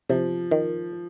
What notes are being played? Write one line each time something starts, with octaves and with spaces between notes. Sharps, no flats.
C3 F3
D#3